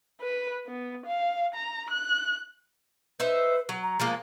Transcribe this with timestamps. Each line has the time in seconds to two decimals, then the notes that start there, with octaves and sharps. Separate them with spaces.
0.21 B4
0.67 B3
1.06 F5
1.54 A#5
1.90 F#6
3.20 D#4 B4 C5 E5
3.69 F#3
3.83 A#5
4.00 F3 G#3 A#3